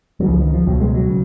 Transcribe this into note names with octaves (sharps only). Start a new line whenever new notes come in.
F#3
C#2 C#3 F3
D#3
F3
C#2 B2 F#3
G#3
F#3
C#3